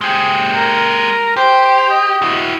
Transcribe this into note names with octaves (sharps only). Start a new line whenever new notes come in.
G#3 G4 G#4
A#4
G4 C5
D#5
E4 F#4